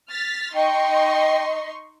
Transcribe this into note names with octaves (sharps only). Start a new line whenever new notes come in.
F6 A6 B6
D#4 D#5 G5 C6 C#6